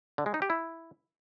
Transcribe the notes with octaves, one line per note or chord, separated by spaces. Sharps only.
D3
G#3
D#4
G4
E4